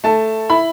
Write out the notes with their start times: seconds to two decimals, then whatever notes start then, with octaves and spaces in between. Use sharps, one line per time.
0.04 A3 A5
0.50 E4 B5